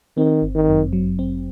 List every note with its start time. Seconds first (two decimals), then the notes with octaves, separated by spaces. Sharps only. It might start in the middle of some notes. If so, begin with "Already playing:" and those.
0.17 D#3 C4
0.42 G1
0.55 D#3
0.68 F#2
0.93 F#3
1.19 C4